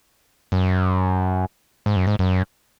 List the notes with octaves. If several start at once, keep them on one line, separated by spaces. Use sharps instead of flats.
F#2
G#2
F#2
G#2
F#2